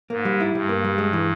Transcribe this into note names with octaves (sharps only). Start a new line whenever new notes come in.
G#2 A#3
G3
E4
G2 G3
A#3
G3
G#3
E3